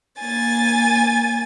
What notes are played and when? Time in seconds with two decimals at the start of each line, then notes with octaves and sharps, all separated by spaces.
0.20 A#3 G#5 A6